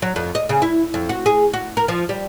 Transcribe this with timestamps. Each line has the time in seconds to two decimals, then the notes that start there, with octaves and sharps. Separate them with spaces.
0.02 F#3
0.16 F2
0.35 D#5
0.49 C#3
0.62 E4
0.94 F2
1.09 F#4
1.26 G#4
1.53 F#4
1.77 A#4
1.88 F3
2.09 G3